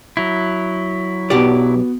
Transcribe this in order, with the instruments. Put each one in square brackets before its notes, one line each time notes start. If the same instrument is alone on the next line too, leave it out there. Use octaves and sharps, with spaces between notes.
[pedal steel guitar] F#3 E4
[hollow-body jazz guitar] B1 G4 D5 [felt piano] B3 F#4